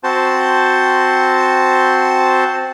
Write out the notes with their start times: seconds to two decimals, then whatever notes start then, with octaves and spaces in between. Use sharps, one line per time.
0.04 C4 F#4 C5 A5